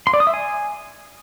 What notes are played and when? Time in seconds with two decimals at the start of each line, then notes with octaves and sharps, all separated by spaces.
0.07 C6
0.14 D5
0.20 D#6
0.27 E5
0.34 G#5